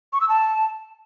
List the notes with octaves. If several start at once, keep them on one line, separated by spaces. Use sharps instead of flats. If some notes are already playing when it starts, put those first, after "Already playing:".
C#6
E6
A5